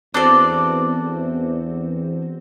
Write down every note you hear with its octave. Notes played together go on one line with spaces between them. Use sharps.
E2 C4 D4 F#4 A4 C5 D5